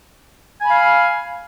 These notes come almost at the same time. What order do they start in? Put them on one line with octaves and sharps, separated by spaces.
G#5 B5 F5